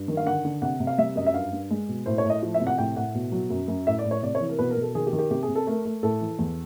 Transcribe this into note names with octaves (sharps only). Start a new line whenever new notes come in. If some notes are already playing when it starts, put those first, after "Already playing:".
Already playing: G2
D#3
F5
D3 F#5
D3
C3 F#5
C3
F5
G3 E5
F#2 D#5
E5
G2 F5
G2
G#3
B2
A2 C5
C#5
A2
D#5
F3
E5
C3
F#5
A2 G5
A2 F#5
B2
F#3
F#2
F#2
A2 E5
D5
A2
C#5
C3 D5
C#5
E3
A#4
B2 B4
A#4
B2
A4
D#3 G#4
G4
D#3
G4
C3 G4
G#4
C3
A4
A3 A#4
A3
A2 A4
E3
E2